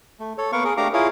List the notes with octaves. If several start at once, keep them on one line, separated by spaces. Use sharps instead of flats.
A3
A4 C#5
A#3 B3 A#4 F5 F#5 C#6
G#4 A#4
A3 D4 G4 F5 A#5 D6
E4 F4 G#4 A#4 C#5 F5